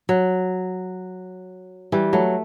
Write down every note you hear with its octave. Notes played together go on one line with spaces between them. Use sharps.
F#3
E3 G3
F#3 A3